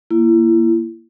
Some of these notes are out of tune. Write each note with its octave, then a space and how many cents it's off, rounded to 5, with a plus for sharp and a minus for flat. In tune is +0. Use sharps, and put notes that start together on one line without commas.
A#3 +0 E4 +30